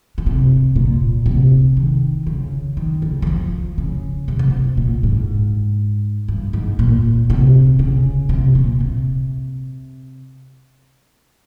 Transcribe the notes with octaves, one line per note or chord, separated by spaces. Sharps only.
C#3
C3
A#2
C3
D#3
C#3
D#3
C#3
G3
F3
C#3
C3
C#3
C3
A#2
G#2
G2
G#2
A#2
C3
C#3
C3
A#2
C3